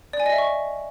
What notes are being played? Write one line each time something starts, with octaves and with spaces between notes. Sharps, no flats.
D5
G#5
D#5
E5
C#6